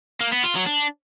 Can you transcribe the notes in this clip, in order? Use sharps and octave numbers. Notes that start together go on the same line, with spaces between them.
A#3
B3
F4
F#3
D4